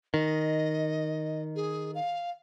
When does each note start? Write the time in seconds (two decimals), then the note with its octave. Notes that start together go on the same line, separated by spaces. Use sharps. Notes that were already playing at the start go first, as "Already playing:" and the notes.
0.14 D#3 D#5
1.56 G#4
1.95 F5